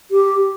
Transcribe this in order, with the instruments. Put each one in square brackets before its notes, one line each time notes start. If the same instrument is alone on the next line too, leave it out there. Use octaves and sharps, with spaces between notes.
[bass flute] G4